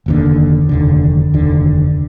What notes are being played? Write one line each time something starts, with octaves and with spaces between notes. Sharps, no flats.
F1 D#2 D3
F1 D#2 D3
F1 D#2 D3